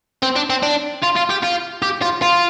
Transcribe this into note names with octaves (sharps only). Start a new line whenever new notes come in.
C4
D4
C4
D4
F4
F4
G4
F4
G4
F4
F4